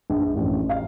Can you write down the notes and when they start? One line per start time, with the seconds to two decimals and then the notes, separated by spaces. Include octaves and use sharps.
0.10 A#1
0.36 A1
0.69 F5